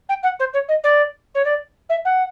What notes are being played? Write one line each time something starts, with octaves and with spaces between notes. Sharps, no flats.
G5
F#5
C5
C#5
D#5
D5
C#5
D5
E5
F#5